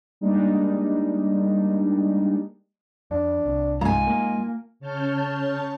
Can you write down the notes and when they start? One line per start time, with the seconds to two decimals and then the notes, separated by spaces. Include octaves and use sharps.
0.21 G3 G#3 A#3 D4 D#4
3.11 F2 D4
3.45 C2
3.81 G#2 F4 G#5 A#5
4.07 A#3
4.80 C#3 C#5 A5 F6 G6